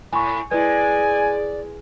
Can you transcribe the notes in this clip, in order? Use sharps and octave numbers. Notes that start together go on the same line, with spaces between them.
A2 G#5 B5 C#6
G#3 E4 B4 D5 G#5